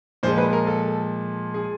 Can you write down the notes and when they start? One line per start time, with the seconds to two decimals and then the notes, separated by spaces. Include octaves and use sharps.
0.23 A#2 F3 G#3 C5
0.38 B4
0.53 A#4
0.67 A4
1.54 G#4